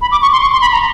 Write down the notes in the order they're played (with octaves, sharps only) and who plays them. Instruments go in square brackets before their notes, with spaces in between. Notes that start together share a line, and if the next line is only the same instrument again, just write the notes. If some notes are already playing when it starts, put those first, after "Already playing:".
[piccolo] B5
D6
C#6
C6
C#6
C6
B5
A#5